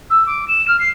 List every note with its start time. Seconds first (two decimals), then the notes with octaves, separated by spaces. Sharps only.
0.10 E6
0.26 D6
0.48 E7
0.68 F6
0.79 C7